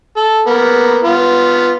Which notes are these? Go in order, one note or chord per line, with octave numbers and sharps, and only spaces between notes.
A4
A#3 B3
B3 F4